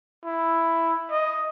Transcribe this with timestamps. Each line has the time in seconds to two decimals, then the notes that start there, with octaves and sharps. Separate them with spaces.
0.24 E4
1.11 D#5